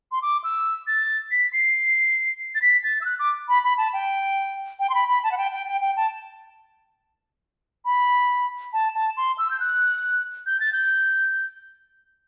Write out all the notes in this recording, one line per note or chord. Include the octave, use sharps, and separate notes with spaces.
C6
D6
E6
A6
B6
C7
A6
B6
A6
E6
F#6
D6
B5
B5
A5
G5
G5
C6
B5
B5
A5
F#5
G5
G5
G5
G5
A5
B5
A5
A5
C6
E6
G6
F#6
G6
A6
G6